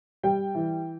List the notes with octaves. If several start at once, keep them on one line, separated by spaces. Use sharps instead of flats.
G3 G5
E3